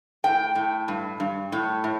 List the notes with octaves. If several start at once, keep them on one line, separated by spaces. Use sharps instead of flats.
A2 G5
A2
G2
G2
A2
A2